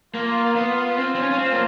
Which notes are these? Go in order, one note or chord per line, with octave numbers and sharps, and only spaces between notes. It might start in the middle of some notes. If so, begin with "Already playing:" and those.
A#3 F4
B3
C4
C4
C#4
C#4
C4
A#3